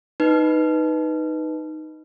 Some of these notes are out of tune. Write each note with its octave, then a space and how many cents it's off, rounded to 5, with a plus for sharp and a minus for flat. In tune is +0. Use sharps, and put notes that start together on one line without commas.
D#4 +0 B4 +0